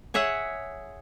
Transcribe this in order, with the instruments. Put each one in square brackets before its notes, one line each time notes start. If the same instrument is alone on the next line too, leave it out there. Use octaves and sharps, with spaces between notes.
[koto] G#4 C#5 E5 F#5